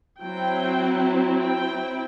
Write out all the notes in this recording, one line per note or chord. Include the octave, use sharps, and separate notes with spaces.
F#3 C4 E4 G5
G5
C4 E4